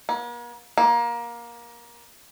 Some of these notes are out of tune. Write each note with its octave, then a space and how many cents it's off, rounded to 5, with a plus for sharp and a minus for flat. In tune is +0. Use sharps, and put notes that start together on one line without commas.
A#3 +45
A#3 +20